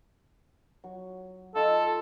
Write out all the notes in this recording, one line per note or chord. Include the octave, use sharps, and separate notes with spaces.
F#3
F4 A4 D#5 E5